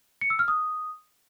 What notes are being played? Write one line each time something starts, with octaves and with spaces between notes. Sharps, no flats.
C#7
E6
F6
D#6